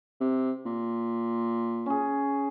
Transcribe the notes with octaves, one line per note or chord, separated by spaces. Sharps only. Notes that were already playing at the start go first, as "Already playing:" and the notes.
C3
A#2
C#4 G#4